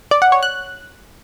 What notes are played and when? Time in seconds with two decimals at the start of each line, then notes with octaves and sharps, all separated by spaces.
0.11 D5
0.22 F#5
0.32 C#5
0.43 F#6